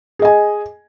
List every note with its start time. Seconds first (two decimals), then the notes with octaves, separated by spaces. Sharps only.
0.19 G#4
0.22 D#5
0.25 G#5